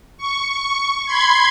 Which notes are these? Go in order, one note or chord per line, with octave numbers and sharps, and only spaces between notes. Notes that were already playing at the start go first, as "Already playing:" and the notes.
C#6
B5 C6 G#6